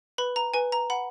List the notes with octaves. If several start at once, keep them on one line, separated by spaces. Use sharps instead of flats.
B4 B5
A#5
B4 G#5
A#5
F#5 B5